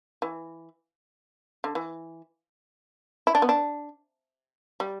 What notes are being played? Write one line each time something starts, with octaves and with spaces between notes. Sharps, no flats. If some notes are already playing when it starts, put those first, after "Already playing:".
E3
D3
E3
E4
D4
B3
D4
G3